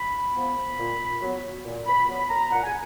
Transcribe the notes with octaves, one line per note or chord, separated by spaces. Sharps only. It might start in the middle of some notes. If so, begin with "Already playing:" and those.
Already playing: B5
F3 B3
A#2
F#3 B3
A#2
B5
F#3 B3 B5
A#5
A#2 F#5
G#5